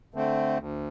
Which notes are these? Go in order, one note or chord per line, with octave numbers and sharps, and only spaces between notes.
D3 A3 C4
D2